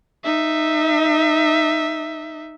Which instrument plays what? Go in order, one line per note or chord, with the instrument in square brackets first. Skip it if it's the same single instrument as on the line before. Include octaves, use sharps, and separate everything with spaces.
[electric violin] D#4 E5